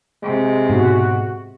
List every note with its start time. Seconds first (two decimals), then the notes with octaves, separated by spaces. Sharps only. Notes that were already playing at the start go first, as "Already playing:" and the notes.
0.23 C3 G#3
0.70 G#2 B2 F#4